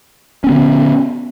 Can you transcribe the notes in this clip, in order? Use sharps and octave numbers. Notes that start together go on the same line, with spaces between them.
D3 B3 C#4